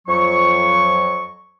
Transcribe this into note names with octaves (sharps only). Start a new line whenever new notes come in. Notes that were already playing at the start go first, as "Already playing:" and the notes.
F2 F#3 C#6